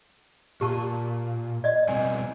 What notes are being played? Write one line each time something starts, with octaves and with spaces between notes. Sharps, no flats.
A#2 G4 A5 C#6
D5 D#5
B2 G3 C4 G#5